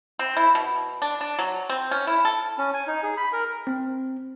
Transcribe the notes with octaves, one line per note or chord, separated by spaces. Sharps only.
C4
E4
B2
D4
D4
F#3
C4
C#4
E4
A4
C#4
G#5
D#4
G#4
B5
A#4
C4